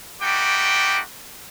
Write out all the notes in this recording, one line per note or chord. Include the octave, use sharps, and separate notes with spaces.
G3 A3 D#4 F#4 G5 D6